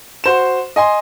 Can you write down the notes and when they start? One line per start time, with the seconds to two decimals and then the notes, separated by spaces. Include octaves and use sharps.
0.24 F#4 C5 E7
0.76 D#5 G#5 C6